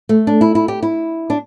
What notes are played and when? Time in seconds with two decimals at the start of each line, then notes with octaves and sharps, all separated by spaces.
0.09 A3
0.27 D4
0.41 E4
0.55 E4
0.68 G4
0.82 E4
1.30 D4